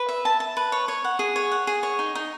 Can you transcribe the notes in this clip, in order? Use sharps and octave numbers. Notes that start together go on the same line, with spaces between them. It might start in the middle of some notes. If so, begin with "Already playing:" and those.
Already playing: B4
E5
A5
A5
B4
C#5
C#5
F#5
G#4
C#5
F#5
G#4
C#5
D#4
D#4